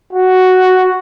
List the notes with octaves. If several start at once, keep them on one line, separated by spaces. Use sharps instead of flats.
F#4